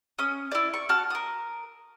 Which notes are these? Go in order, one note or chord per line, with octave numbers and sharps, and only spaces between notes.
C#4 D#6
E4 D5
C#6
F#4 A5 F6
A#4 D#6